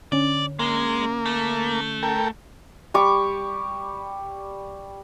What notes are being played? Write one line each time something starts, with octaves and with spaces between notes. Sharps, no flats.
D3 C#4 D5
G#3 A#3
A3
A4 A#4 G5
G3 C#6 D6